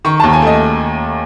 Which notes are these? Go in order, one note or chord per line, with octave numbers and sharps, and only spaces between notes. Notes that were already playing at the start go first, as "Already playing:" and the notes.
D#3 C#6
D#2 A5
G#5
A3 D#5